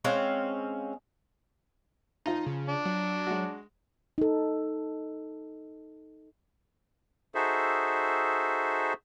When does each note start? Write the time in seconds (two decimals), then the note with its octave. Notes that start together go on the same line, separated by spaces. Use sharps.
0.04 G#3 C4 C#4 F5
2.26 F3 D#4 F4 A#5
2.46 C#3
2.69 D4
2.85 F#3
3.27 G#3 F#4
4.18 D#4 A4
7.35 D#4 F#4 G#4 A4 C5 E5